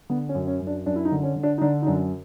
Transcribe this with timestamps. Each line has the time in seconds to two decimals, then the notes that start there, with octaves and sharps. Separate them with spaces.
0.09 D3 B3
0.29 C#4
0.35 F#2
0.47 C#4
0.61 F#2
0.67 D4
0.86 F#2 D4
0.96 E4
1.05 D#4
1.12 D3
1.23 C#4
1.36 D3
1.43 D4
1.58 D#4
1.61 D3 D4
1.82 D#4
1.87 F#2 D4